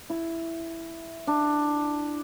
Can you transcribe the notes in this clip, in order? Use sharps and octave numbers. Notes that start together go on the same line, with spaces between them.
E4
D4